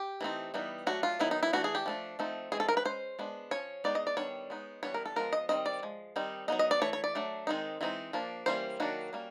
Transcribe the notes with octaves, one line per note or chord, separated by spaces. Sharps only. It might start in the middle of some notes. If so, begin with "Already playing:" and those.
Already playing: G4
E3 A3 C4 D#4
E3 G3 B3 D#4
F#3 A3 D4 F#4
F4
D#3 F#3 B3 D#4 E4
D#4
E4
E3 A3 D4 F#4
G#4
G4
F3 A3 D4
F3 A3 C4 D#4
E3 G#3 C4 G#4
A4
A#4
B4
G#3 C#4 C5
G#3 B3 D4
F3 A#3 C#4 C#5
G#3 B3 D#4 D5
D#5
D5
D#3 G3 B3 D4 C#5
G#3 B3 D#4
E3 G3 B3 D4 C#5
A#4
A4
F3 G#3 B3 A#4
D#5
D#3 G3 C4 D#5
D5
F3 G#3
D#3 G3 C4 D#4
F#3 B3 D#4 D#5
D#5
D5
E3 A3 C#5
C#5
D5
F#3 A3 D4
D#3 G#3 C4 D#4
E3 G#3 C4 D#4
F3 A#3 D4
E3 G3 A#3 C#4 C5
D#3 F#3 A#3 D4 F#4
G3 A#3 C#4